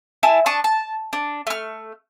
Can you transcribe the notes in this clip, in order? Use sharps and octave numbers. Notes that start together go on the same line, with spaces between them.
E4 G#4 A5
D4 A5 C#6 D#6
A5
D4
A3 F6